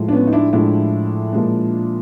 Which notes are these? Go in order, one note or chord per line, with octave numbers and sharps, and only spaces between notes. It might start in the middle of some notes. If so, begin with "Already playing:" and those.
Already playing: A2 F3 G#3
D4
B3 C#4
D#4
D4 E4
A2 F3 G#3 D4 E4
A#2 F3 G#3